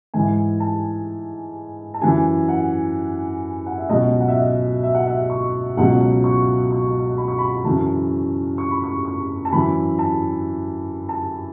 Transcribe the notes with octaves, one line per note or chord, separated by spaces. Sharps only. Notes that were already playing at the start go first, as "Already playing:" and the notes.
G#2 E3 G#5
A5
A5
F#2 E3 G#5
F#5
F#5
E5
C#2 B2 F#3 D#5
F#5
E5
D#5
E5
F#5
E5
C#6
C#2 B2 F#3 F#5
C#6
C#6
B5
C#6
B5
F#2 C#3 E3 A5
C#6
B5
C#6
C#6
A5
F#2 E3 B5
A5
A5